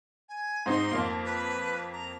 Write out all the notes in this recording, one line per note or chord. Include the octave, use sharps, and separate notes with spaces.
G#5
G#2 C4 D#4 C6
F2 A#3
B4
A#5